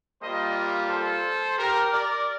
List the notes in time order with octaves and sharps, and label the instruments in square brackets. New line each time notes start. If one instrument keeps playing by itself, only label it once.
[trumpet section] G3 A#3 F4 C5 D#5
A4 C5
G4 A#4
A#4 D5